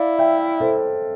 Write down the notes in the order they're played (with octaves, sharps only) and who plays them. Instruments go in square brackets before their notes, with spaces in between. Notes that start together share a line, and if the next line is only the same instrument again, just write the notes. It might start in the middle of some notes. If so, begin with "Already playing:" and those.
Already playing: [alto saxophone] E4 [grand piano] D5 F5
[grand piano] E5 G5
A4 C5